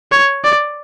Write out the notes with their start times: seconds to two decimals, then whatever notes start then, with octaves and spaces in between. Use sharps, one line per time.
0.12 C#5
0.44 D5